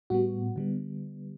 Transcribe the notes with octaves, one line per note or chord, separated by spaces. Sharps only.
A2 G3 B3 F#4
D3 G3 B3